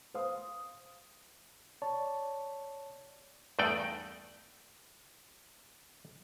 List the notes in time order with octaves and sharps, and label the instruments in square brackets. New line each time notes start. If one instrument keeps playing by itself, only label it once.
[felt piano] C5 F5 D#6
[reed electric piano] C#5 D5 A5
[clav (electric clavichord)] E2 G2 A3 D#4 D5 G5